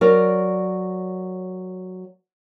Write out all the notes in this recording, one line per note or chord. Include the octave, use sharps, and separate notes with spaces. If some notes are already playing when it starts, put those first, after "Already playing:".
F#3 A#4 D5